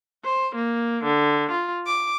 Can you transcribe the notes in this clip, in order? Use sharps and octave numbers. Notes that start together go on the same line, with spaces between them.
C5
A#3
D3
F4
D6